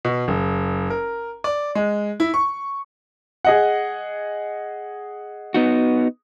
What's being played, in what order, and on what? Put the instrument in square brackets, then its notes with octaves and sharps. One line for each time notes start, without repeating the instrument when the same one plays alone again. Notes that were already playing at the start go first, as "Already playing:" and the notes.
[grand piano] B2
F#1
A#4
D5
G#3
E4
C#6
G#4 D#5 F#5
[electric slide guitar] B3 D#4 F#4